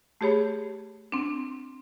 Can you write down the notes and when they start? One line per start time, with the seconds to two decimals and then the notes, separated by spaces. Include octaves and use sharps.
0.21 A3 G4 G#4 C#5 B5
1.12 C4 D4